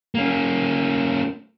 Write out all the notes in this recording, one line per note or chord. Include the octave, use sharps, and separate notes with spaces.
A#3 C#4